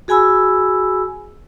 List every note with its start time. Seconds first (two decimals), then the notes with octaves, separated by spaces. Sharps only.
0.08 F#4 G#4 G#5 B5 E6